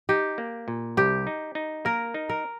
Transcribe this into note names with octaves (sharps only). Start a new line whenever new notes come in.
D#4 G4
A#3
A#2
C2 G4
D#4
D#4
A#3 A#4
D#4
A#4